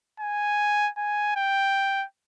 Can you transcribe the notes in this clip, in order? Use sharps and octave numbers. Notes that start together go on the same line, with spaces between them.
G#5
G#5
G5